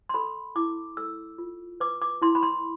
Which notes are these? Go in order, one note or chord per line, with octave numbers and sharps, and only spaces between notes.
C6
A4 B5
E4 D6
A4 E6
F4
B4 D6
D6
E4 C6
B5
C6